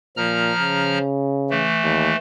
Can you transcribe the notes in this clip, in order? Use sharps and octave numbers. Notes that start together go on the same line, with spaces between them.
A#2 F3 A#5 F6
C#3
E3 A3
D#2